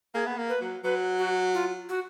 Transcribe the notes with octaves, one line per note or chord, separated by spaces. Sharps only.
A#3 G#4
B3
A#3
B4
F#3
F#3 B4
F#4
F4
F#4